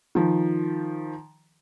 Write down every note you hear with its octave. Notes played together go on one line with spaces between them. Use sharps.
D#3 F3